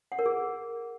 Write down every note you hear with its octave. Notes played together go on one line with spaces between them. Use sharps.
F#5
A#4
G#4